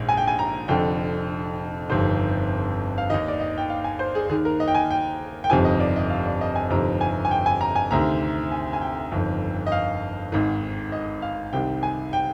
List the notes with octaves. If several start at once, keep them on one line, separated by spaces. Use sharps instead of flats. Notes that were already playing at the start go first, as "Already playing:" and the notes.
Already playing: A#1 G#2 D#3
G#5
G5
G#5
A#5
F1 F2 D3 G5
G1 F2 C3 D#3 C5
F5
D#2 D#3 D#5
D5
D#5
G5
F5
G#5
C5
G#4
D#2 D#3 G#4
A#4
D#5
G5
G#5
G5
G5
G1 F2 C3 D#3 G#5
D#5
D5
D#5
F5
D5
D#5
G#5
G1 F2 C3 D#3 A#5
G#5
G#5
G5
G#5
A#5
G#5
D2 C3 D#3 A#5
G#5
G#5
G5
G1 F2 D#3
D#5
F5
G#1 G#2 D#3
D#5
F5
C2 C3 D#3 G5
G#5
G5